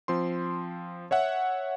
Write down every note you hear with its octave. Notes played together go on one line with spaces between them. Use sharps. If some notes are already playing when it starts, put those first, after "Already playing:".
F3 C4 C6
C#5 E5 F#5